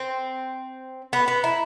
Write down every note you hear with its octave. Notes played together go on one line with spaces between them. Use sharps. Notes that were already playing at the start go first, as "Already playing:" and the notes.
Already playing: C4
C6
B3 B5
B3 B5
E4 A#5